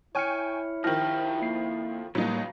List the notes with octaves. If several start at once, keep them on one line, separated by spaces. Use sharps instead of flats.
E4 C#5 G5 G#5 C#6 F6 C#7
F2 D#3 F3 G4 F6 A#6
F2 A#3 C7
C#2 A2 F#3 G3 A#3 D#4